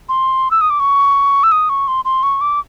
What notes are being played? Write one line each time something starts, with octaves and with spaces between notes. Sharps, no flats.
C6
E6
D#6
D6
C#6
E6
D#6
C#6
C6
C6
C#6
D6